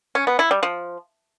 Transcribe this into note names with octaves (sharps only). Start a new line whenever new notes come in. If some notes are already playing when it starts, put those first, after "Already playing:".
C#4
B3
E4
G3
F3